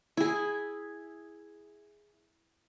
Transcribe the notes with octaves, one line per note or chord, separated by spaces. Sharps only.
E4 G#4